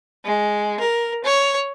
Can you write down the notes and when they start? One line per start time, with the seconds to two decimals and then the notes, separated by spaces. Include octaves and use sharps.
0.25 G#3
0.80 A#4
1.24 C#5